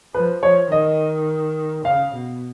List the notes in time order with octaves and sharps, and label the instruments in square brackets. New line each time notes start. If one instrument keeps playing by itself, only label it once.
[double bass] F3 [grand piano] B4
[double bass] F3 [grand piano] C#5
[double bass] D#3 [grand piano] D#5
[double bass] C#3 [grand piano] F5
[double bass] B2